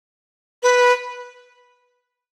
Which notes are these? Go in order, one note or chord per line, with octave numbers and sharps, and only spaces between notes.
B4